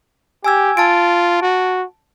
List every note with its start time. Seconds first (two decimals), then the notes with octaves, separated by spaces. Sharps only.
0.44 G4 G#5 E6 G#6
0.77 F4 A5 A6 D7
1.42 F#4